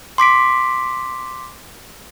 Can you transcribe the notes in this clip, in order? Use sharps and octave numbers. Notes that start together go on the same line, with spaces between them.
C6 D6 B6 D7